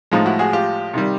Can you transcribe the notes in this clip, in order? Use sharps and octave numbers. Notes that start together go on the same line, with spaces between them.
A2 F3 G#3 D#4 F4
E4 F#4
F#4 G#4
F4 G4
C3 D#3 G3